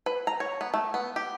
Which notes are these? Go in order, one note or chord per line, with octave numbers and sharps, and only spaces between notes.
B4
A#5
C#5
B3
A3
B3
G4